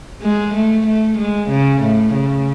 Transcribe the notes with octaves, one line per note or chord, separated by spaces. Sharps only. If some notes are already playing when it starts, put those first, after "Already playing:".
G#3
A3
A3
G#3
C#3
A2
C#3